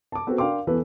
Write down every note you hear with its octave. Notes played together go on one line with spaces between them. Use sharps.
A5 D6
B3 C4 F#4 A4
D4 A#4 F5 G5 C6 D6
E2 E3 A4 B4